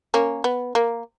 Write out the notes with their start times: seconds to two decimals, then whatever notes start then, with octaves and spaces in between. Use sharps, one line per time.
0.14 A#3 C#4
0.44 B3
0.75 A#3